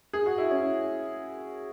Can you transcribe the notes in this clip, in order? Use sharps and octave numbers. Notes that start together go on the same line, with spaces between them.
G#4
F#4
E4
C#4